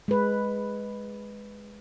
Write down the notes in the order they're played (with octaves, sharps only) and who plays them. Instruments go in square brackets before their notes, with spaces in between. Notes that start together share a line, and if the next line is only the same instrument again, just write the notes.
[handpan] G#3 B4